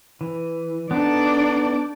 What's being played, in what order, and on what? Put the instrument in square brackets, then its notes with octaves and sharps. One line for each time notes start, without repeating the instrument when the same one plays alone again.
[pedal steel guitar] E3
[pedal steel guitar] B3 D#4 A4 [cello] D4 D5